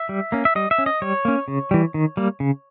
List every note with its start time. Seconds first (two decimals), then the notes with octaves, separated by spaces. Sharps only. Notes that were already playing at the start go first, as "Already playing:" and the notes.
Already playing: E5
0.09 G3
0.32 A#3 C#4
0.45 E5
0.55 G3 D#5
0.71 E5
0.78 C#4
0.86 D#5
1.02 G3 C#5
1.25 A#3 C#4
1.48 C#3
1.71 E3 G3
1.94 D#3
2.17 G3 A#3
2.40 C#3